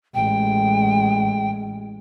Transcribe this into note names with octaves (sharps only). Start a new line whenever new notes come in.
A1 G#3 G5